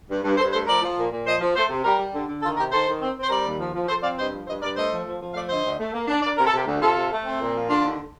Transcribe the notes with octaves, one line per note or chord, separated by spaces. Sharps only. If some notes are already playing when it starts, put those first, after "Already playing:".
G2
G2
G2 A4 C5
A3 A4 C5
F3 A#4 D5
F3
A#2
A#2
F3 C5 D#5
F3
A3 A4 C5
C3
G3 G4 A#4
G3
D3
D3
D#3 F4 A4
C3 G4 A#4
D#3 A4 C5
D#3
C4
C4
C5
G3 A#4 D5
D#2
F3
F3
F3 A4 C5
C4 D5 F5
G2 C5 D#5
F3
G2 C5 D#5
G2 A#4 D5
A3 C5 D#5
F3
F3
F3
A3 D5 F5
D3 C5 D#5
D2
A3
A#3
D4
D4 A#4 D5
C3 A#4
A4
C3 G4 A#4
D2
C3 F4 A4
C3
A3
C4
A#2
F3
D3 D4 F4
D#2